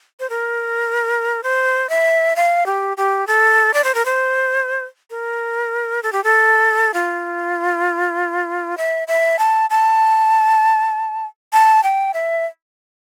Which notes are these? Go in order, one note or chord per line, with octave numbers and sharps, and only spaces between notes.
C5
A#4
C5
E5
F5
G4
G4
A4
D5
C5
A#4
C5
A#4
A4
G4
A4
F4
E5
E5
A5
A5
A5
G5
E5